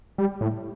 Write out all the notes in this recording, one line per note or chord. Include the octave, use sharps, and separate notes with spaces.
G3
A2